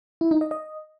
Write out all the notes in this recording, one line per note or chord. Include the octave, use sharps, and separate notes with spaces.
E4
D#4
D#5
D#5